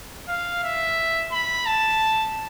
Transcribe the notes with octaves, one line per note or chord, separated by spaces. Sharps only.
F5
E5
B5
A5